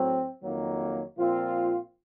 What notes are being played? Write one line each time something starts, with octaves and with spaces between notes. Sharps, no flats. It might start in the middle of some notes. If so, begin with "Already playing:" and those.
Already playing: A2 F#3 C4
F2 D#3 F#3 A#3
A#2 F3 C4 F4